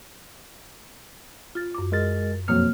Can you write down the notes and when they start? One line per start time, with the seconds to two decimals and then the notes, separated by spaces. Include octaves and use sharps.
1.55 F4 A6
1.75 F#2 D6
1.92 G#3 A#4 A6
2.48 F2 B2 F#3 A#3 F6